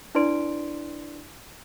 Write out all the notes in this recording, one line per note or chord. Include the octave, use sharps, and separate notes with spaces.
D4 E4 B4 D5 C6 D7